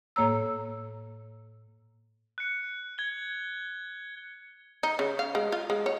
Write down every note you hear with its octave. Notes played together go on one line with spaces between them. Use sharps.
A2 A#3 C#5 A#5 E6
F#6 C#7
G#6 G7
D#4
C#3
F5
G#3
F4
G#3
C#5